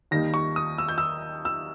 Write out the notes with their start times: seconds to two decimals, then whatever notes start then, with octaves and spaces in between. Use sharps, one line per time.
0.11 D#2 D#3 G3 A#3 D#4 A#6
0.34 C#6
0.56 D#6
0.78 E6
0.88 G6
0.98 E6
1.45 E6